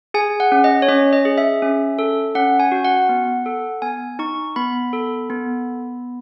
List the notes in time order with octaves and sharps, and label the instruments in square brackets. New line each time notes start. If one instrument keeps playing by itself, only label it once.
[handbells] G#4 G#5
F#5
C#4
D#5
C#5
C#4 D#5
D#5
G#4
E5
C#4
A4
C#4 F#5
G#5
F#4
F#5
B3
A4
B3 G#5
D#4 C#6
B3 B5
A4
B3